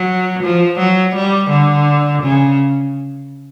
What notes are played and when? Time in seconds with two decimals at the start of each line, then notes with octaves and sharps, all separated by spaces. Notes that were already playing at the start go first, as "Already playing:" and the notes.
Already playing: F#3
0.43 F3
0.79 F#3
1.15 G3
1.50 D3
2.23 C#3